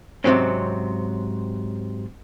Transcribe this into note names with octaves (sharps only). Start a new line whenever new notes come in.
G#2 C3 E3 F#3 C4 C#4